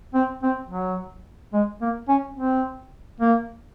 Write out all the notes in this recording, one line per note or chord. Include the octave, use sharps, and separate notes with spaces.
C4
C4
F#3
G#3
A#3
C#4
C4
A#3